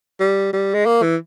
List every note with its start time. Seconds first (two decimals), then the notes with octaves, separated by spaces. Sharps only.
0.20 G3
0.53 G3
0.74 G#3
0.86 A#3
1.02 E3